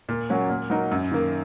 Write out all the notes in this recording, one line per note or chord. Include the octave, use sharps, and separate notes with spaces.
A#2
F#3 A#3 C#4
A#2
F#3 D#4 A#4
F#2
D#3 A#3